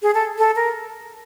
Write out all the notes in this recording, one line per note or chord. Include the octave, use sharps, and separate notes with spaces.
G#4
A4
A4
A#4